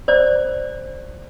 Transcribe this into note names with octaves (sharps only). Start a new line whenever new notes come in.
C5 D5